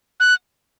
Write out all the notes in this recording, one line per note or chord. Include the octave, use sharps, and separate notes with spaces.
F#6